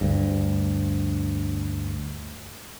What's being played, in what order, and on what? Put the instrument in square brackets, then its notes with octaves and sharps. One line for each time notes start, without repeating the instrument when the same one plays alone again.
[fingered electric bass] D2 G2